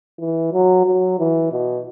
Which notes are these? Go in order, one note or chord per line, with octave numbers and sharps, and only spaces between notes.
E3
F#3
F#3
E3
B2